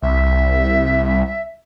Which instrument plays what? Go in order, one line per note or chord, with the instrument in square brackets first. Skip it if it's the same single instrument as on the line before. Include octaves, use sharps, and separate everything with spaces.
[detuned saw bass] C2 [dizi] E5